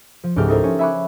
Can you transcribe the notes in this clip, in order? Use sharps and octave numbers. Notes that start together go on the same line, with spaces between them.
F3
C#2 G#2 A3 G4 F6
D#4 E4 A4 A#4 C5
F3 C#4
E5 G#5 B5 C#6 D6 F#6